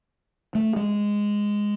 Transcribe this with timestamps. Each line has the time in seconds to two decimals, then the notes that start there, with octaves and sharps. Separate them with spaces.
0.55 A3
0.76 G#3